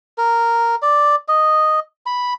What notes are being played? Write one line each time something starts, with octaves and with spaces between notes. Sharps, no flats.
A#4
D5
D#5
B5